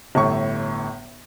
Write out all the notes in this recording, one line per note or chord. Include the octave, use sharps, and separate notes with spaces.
G1 A2 C#6